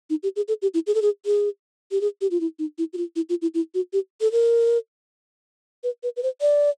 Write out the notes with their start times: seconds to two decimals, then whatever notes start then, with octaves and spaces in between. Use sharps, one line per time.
0.10 D#4
0.23 G4
0.36 G#4
0.48 A4
0.62 G4
0.74 E4
0.87 G#4
0.95 A4
1.02 G#4
1.26 G#4
1.91 G4
2.01 G#4
2.21 G4
2.31 F4
2.41 E4
2.59 D#4
2.78 E4
2.93 F#4
2.97 F4
3.16 E4
3.29 F4
3.42 E4
3.54 E4
3.74 F#4
3.93 G4
4.21 A4
4.32 A#4
5.84 B4
6.03 B4
6.17 B4
6.23 C5
6.41 D5